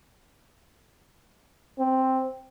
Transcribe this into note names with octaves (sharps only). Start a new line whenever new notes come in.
C4